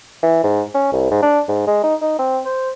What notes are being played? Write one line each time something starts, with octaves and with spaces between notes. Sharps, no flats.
E3
G#2
C#4
C2
G#2
D4
G#2
G#3
D#4
D#4
C4
C5